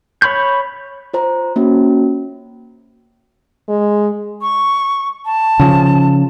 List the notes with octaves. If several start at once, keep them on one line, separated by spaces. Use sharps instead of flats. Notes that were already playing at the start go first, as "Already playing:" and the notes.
C#5 B5 C#6 G6
F4 C5 A#5
A#3 C#4 F#4
G#3
C#6
A5
C#3 F3